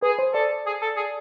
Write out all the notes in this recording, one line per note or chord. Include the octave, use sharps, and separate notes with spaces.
G#4 B4
C5
A4 D5
G#4
A4
G#4